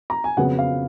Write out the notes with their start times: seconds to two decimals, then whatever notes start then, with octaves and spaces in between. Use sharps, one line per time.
0.10 A#5
0.24 G#5
0.37 F2 C#3 F#3 B3 F#5
0.59 F5